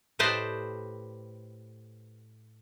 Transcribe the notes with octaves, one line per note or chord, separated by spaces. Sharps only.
A2 G4 B4 C5 D#5 A5